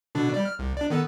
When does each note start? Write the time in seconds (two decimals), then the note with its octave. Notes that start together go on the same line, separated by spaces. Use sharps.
0.15 B2 D3 D4
0.34 G3 D5
0.45 F6
0.59 C2
0.77 D4 D5
0.90 D#3 B3 A4